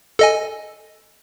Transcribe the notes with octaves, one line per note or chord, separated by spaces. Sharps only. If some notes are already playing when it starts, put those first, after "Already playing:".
A4 D#5 G#5